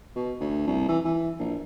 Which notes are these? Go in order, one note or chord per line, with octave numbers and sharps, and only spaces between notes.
B2
D2
C2
E3
E3
A#1